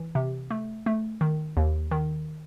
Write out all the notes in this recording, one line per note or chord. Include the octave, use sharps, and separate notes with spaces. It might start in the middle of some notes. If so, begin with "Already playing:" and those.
Already playing: E3
C3
A3
A3
D#3
D#2
D#3